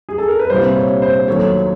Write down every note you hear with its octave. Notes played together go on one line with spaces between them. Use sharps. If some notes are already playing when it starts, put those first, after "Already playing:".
G#4
A4
A#4
B4
C2 A#2 G3 A#3 C5
C#5
C5
D#2 D#3 F#3 A3 C#5